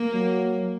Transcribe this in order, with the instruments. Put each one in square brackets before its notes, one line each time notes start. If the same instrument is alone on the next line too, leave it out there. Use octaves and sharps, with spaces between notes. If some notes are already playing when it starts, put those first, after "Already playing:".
Already playing: [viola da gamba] A#3
[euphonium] F#3